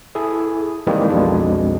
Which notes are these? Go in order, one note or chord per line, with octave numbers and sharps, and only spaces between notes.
E4 G#4 A4
D#3 E3 G3 G#3 A#3 C4
B1 F2 B2 G#3 D4